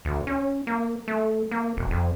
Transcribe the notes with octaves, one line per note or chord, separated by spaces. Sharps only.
D2
C#4
A#3
A3
A#3
E1
F2